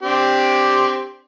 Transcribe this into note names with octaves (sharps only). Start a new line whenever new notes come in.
C4 D4 G4